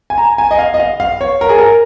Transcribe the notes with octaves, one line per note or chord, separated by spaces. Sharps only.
G#5
A#5
G#5
D#5
F5
D#5
F5
F5
C#5
A#4
G#4
A#4